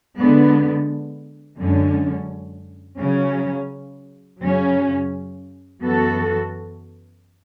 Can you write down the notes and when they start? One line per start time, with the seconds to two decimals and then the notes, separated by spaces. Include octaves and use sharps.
0.18 D3 G#3 B3
1.58 F#2 D3 G#3 C#4
3.00 C#3 F#3 C#4
4.41 F#2 C#3 F#3 C#4
5.82 F#2 E3 B3 F#4 A4